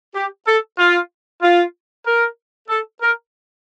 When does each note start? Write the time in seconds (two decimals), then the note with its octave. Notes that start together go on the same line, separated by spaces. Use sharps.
0.15 G4
0.47 A4
0.78 F4
1.42 F4
2.05 A#4
2.69 A4
3.01 A#4